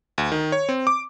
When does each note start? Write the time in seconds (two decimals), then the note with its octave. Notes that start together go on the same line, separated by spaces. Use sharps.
0.18 D2
0.32 D#3
0.52 C#5
0.69 C4
0.87 D6